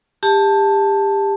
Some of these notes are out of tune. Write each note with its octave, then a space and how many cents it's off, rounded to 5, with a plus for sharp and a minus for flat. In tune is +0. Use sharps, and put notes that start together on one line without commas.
G4 +25 A5 +0